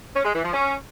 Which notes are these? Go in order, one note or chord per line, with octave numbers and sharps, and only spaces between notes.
C#4
G#3
E3
F3
C#4